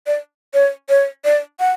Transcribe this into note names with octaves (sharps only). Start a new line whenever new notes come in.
D5
C#5
C#5
D5
F#5